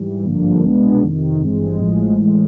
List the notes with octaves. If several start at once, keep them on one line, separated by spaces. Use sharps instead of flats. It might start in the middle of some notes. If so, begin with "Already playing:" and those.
Already playing: G#2 E3 G3
G#1 G2 D3 F3 A#3
C2 B2 G#3 B3 D4
F2 C3 D#3
G#1 G2 E3 G#3 C4
A1 A2 F3 G#3
A2 E3 G#3